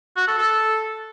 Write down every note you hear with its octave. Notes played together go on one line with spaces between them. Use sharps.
F#4
A4
A4